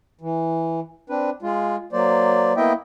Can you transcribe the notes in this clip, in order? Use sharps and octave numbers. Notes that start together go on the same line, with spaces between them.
E3
C4 D4 B4
G#3 F4
F#3 A#3 C5 D5
A#3 B3 E4 D#5 E5 G5